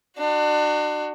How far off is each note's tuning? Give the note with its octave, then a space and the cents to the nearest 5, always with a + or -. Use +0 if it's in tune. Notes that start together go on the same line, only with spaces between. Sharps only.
D4 +35 F#4 +10